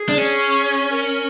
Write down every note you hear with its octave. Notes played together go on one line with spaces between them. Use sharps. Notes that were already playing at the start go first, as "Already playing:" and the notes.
Already playing: G#4
D4
C#4
A#4